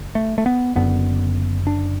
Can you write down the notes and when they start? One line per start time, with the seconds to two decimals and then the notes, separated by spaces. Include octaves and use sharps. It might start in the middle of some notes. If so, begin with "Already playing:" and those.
Already playing: F#1 F#2
0.15 A3
0.38 A3
0.46 B3
0.75 F#1 F#2 D3 B3
1.67 D4